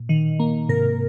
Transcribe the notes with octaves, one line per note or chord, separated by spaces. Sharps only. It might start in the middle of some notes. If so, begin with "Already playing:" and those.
Already playing: A#2
D#3
A#3
G#2 C3 A#4